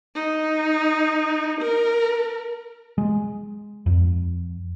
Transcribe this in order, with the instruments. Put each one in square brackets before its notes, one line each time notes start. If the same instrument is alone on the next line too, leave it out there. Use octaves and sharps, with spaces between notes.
[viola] D#4
A#4
[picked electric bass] G#3
F2